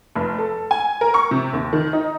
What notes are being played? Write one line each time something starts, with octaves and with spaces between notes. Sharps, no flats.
F1
A4
G#5
A#4
C#6
C3
D#2
D#3
D#4